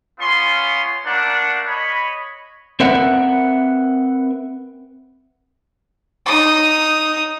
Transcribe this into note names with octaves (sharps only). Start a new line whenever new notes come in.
B3 C#4 F4 C6
A3 A#3 D4 F#5
C#5 D#5 B5
C4 A#4 B4 E5 F#5
D#4 D#6